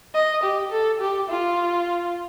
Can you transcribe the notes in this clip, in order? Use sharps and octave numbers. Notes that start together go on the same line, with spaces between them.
D#5
G4
A4
G4
F4